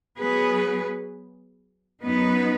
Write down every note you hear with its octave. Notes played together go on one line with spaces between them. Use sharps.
F#3 B3 G#4 B4
F#2 F#3 B3 D#4 B4